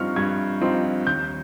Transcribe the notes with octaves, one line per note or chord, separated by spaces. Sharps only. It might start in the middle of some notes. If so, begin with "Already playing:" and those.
Already playing: G2 F3 C4 D#4 C#6 F6
G2 G#6
F3 C4 D#4
D#2 G6